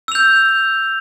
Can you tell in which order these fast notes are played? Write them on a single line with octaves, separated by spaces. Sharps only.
E6 F7 G6